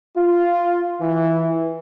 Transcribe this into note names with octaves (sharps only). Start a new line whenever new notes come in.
F4
E3